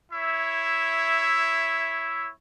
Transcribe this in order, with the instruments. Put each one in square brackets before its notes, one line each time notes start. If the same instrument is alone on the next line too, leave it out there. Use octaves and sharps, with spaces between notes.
[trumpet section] E4 C#5 E5